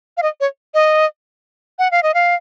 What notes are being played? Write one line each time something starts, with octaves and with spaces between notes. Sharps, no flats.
F5
D#5
C#5
D#5
F#5
F5
D#5
F5